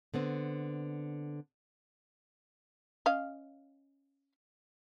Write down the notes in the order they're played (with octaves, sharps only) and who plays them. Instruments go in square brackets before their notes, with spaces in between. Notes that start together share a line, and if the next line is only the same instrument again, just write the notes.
[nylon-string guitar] D3 B3 C4
[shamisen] C#4 D#5 F5